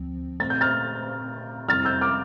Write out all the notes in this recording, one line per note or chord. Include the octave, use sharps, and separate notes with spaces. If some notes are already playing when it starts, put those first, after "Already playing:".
Already playing: D2 F3 C4
A#2 A3 C4 A6
G6
F6 A6
F2 C3 G3 C4 E4 F6 A6
E6 G6
D6 F6